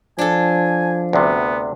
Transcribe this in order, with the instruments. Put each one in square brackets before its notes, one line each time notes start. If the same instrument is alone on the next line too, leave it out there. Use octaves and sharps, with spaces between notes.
[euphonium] F3 [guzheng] D4 A4 [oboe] G#5
[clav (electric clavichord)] D2 C3 [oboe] B3